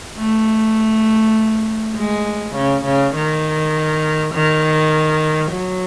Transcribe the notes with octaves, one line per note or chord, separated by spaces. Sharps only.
A3
G#3
C#3
C#3
D#3
D#3
F#3